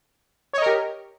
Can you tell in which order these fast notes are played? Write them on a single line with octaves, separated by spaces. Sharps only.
C#5 D#5 A#4 G4